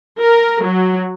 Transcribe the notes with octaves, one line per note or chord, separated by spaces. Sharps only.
A#4
F#3